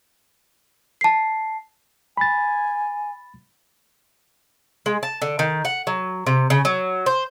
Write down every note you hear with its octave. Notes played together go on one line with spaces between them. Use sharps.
A5 C7
G#5 B5 A6
G#3
A5
D3
D#3
F#5
F#3
C3
C#3
F#3
C5